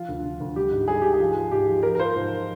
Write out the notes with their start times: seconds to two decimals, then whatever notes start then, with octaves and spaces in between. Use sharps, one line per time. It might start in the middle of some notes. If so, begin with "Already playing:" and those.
Already playing: F3 F4
0.09 D2
0.24 D3
0.40 D2
0.56 G3 G4
0.72 G#2
0.88 G3 G#4
1.02 G#2 G4
1.14 G#4
1.19 F3
1.35 F3
1.51 G#2 G4
1.67 F3
1.83 F3 A#4
1.95 A#4
1.99 F3 C5
2.16 G#2